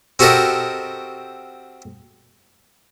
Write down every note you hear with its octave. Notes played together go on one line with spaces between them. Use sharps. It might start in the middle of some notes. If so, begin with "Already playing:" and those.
C4 F#4 G4 A4 A#4 D#5